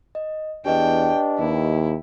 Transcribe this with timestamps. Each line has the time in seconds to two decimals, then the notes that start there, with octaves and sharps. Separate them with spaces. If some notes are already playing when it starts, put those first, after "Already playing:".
0.15 D#5
0.66 E2 D4 G4 B4 D#5 G5
1.39 D#2 E4